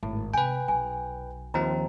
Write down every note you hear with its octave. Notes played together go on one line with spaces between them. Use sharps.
G#1 A2
C3 B4 G5 G#5
B1 G#5
D#2 F3 C4 A#5